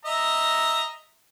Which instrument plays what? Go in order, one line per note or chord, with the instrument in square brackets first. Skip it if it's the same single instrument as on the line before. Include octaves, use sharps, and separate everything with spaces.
[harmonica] D#5 E5 A#5